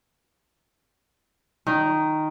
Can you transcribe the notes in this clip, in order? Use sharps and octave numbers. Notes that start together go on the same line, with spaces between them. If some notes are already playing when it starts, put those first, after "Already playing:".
D#3